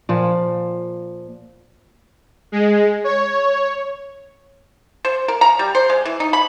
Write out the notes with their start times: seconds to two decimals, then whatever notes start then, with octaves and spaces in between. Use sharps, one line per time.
0.09 A#2 F3
2.52 G#3
3.04 C#5
5.05 C5
5.28 A#4
5.41 A#5
5.59 G3
5.75 C5
5.90 G#3
6.05 E3
6.20 D#4
6.33 B5